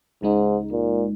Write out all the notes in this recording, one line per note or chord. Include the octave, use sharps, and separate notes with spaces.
C#2 G#2 C#3 G#3 D#4
A#2